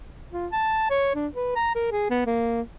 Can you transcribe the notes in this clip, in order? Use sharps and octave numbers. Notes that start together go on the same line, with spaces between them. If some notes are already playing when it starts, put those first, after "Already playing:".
F4
A5
C#5
D4
B4
A#5
A#4
G#4
B3
A#3